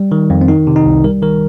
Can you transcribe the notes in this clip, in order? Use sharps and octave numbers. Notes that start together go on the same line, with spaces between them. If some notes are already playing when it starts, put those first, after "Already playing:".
Already playing: G3
D#3
F2
C4
D#3 D#4
C3
D#4
C2
G3 A#4
D#3 A#4